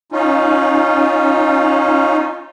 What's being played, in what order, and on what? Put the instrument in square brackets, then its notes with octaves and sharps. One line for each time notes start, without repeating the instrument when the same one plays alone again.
[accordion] C#4 D#4 F4